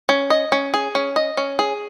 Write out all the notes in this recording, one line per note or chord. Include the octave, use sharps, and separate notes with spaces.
C#4
D#5
C#4
G#4
C#4
D#5
C#4
G#4